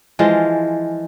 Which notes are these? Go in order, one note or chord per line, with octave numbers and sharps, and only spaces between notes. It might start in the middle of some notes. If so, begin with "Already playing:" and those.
E3 F3 G#3 F4